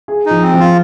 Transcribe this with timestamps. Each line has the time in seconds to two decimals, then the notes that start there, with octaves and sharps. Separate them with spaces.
0.08 G#4
0.26 F3 D#4
0.42 C4
0.53 F3
0.59 F4